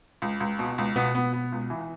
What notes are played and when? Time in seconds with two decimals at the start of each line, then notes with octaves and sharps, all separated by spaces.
0.22 C#2
0.40 C#2
0.59 B2
0.78 C#2
0.96 B2 B3
1.15 B3
1.33 B3
1.52 C#2
1.70 E3